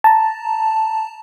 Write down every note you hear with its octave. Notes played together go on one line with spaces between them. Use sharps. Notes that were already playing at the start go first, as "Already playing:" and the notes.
A5 A#5